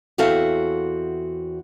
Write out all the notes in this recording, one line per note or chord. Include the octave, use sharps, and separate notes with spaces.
E2 C4 F#4 A4 E5 F5